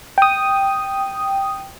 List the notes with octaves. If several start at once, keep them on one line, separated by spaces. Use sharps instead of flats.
G5 D#6